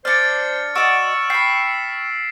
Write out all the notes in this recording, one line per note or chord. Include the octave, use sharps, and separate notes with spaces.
D4 C5 D5 F6 A6 C#7
F#4 D5 D#5 C#6 E6 D7 E7
G5 B5 B6 C7